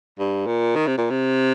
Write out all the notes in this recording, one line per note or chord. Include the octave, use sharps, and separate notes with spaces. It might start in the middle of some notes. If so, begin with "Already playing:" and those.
G2
A#2
D#3
C3
A#2
C3